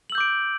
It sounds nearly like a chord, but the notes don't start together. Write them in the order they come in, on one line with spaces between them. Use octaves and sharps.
F#7 E6 G6 D6 D7